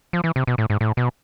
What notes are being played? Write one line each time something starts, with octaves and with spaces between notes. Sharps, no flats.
F3
E3
C3
B2
A2
G#2
A2
B2